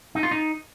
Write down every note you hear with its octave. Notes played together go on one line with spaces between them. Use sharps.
D#4
F4
D#4